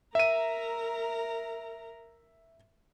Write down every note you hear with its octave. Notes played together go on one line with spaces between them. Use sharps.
A#4 E5 A#5 D#7